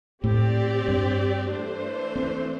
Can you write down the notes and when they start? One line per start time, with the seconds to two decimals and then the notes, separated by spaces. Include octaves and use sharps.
0.23 A2 C4 G4 D5
0.88 G2
1.51 E3 A3 D4 C5
2.16 C4